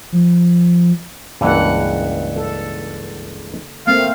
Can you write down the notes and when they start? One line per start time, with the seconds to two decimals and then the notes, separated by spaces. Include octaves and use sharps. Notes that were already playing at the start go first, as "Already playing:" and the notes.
0.13 F3
1.41 C#2 G2 C#3 E3 A#3 F#5
2.36 A4
3.87 A3 A#3 C4 F5 G5